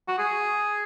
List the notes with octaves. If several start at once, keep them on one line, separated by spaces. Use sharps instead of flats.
F#4
G#4